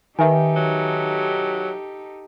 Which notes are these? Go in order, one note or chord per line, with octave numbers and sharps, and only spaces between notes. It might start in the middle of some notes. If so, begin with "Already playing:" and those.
D#3 D#4 G4 A4 B4 E5 G#5
F#3